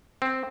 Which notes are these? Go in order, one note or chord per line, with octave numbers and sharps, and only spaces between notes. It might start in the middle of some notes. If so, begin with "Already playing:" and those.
C4